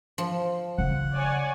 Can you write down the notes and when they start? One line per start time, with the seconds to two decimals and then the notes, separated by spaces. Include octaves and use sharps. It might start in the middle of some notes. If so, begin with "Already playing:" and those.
0.18 F3
0.78 C#3 F#5
1.14 C#5 D5 G#5